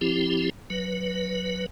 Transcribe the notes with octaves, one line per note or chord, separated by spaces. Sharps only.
F3 C4 E4 G4
F#3 B4